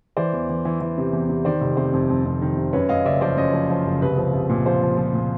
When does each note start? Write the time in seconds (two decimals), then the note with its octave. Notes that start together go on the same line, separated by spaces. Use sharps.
0.17 E3 C5 D5
0.33 E2
0.49 E3
0.65 E3
0.81 E3
0.98 C3
1.13 E2
1.29 C3
1.45 D#3 C5 D5
1.61 F1
1.77 C3 C5
1.93 F2
2.09 F2
2.25 F2
2.42 D#3
2.57 C3
2.73 F#2 B4 C#5
2.89 F#2 D#5 F5
3.05 F#1 D5 E5
3.21 F3 C5 D5
3.37 F#2 C#5 D#5
3.53 F3
3.70 F3
3.86 F#1
4.02 C2 B4
4.17 F3
4.33 C2
4.49 A#2
4.65 F3 C5
4.82 F3
4.97 F3
5.14 A#2